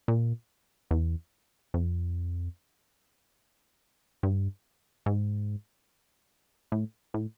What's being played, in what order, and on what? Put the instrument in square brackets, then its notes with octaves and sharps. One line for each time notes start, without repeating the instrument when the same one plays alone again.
[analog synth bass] A#2
E2
F2
G2
G#2
A2
A2